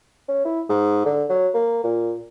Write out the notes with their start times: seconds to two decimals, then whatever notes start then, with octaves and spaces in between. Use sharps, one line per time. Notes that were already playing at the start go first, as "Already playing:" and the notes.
0.28 C#4
0.45 E4
0.69 G#2
1.06 D3
1.29 F#3
1.54 A#3
1.84 A#2